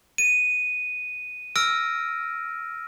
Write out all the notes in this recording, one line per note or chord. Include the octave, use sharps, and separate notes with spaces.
D#7
E6 F6 A#6 D7